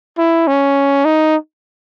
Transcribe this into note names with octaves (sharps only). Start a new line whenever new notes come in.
E4
C#4
D#4